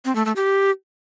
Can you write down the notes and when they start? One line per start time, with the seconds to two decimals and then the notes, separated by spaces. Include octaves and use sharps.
0.05 C4
0.15 A3
0.26 A3
0.36 G4